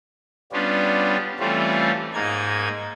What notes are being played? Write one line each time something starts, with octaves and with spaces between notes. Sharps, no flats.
G3 B3 C#4 D4 F4
E3 G3 A3 C4 C#4 F4
G#2 A#3 D#4 G#6